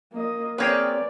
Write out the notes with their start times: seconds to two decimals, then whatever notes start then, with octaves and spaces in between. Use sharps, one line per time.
0.12 A#3 D#5
0.58 A#3 C4 G#4 B4 C#5 D5 G5